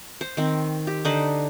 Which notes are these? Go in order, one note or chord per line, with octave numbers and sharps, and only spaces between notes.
C5
D#3 C4
G4
D3 D#4 B4 C5